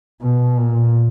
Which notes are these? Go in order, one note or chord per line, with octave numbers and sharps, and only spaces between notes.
B2
A#2